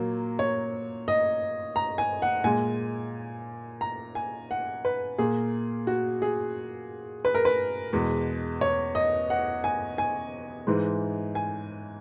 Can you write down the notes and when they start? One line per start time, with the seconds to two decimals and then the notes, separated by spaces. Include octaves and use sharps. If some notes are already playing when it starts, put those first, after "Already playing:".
Already playing: A#2 F#3 A#3
0.39 C#5
1.08 D#5
1.76 A#5
1.98 G#5
2.22 F#5
2.44 A#2 G#3 G#5
3.81 A#5
4.15 G#5
4.51 F#5
4.85 B4
5.18 A#2 A#3 G#4
5.87 F#4
6.22 G#4
7.25 B4
7.35 A#4
7.45 B4
7.93 E2 B2 G#3
8.61 C#5
8.95 D#5
9.30 F#5
9.64 G#5
9.98 G#5
10.67 G#2 E3 G#3
11.35 G#5